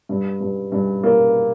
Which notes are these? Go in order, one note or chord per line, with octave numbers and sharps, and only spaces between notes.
G2
G2
G2
A#3